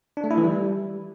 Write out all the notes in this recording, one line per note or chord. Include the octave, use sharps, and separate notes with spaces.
D4
A3
E4
E3
G3